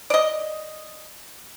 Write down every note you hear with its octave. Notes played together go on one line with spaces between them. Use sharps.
D5 D#5